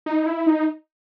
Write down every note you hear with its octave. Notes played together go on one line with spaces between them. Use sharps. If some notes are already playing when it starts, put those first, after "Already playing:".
D#4
E4
D#4